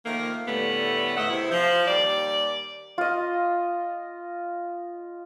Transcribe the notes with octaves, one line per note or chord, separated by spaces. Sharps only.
D#3 F3 A3 A#3
A2 D3 G3 A3 B3
E2 A2 D#5 E5 F#5
C3 E4
F3
D#2 G3 D5
F4 D#5